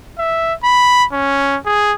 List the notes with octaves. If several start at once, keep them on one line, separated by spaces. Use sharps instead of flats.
E5
B5
C#4
G#4